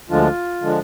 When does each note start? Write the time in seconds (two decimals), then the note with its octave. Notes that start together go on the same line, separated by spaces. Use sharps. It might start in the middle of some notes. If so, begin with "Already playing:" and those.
0.09 D2 D3 F3 G#3 D4 F4
0.61 D3 F3 G#3 D4